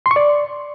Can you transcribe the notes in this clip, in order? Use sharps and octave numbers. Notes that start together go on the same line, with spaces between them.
C6
C#6
D5